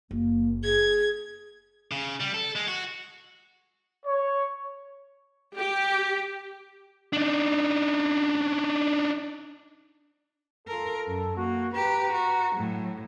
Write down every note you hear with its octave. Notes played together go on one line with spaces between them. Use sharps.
F#1 A#3
G#4 G#6
C#3
G3
A4
G#3
F#4
C#5
G4
D4 D#4
F4 A4 A#4
F#2
A#3 F#4
G4 B4 A#5
F#4
A2 F#3